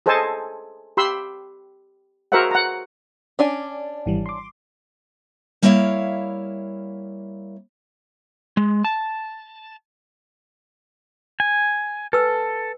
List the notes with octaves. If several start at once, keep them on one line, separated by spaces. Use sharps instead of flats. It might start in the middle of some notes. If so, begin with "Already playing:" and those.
G#4 A4 C5 D#5 G#5 A5
G4 B5 C6 E6
F#4 G#4 A#4 C5 E5 F#5
F#5 A#5
C#4 D4 D5 G#5
G#1 E3 G3
C6 D6
G3 A#3 E4 C#5 E5 F5
G#3
A5
G#5
A4 B4 G#5 E6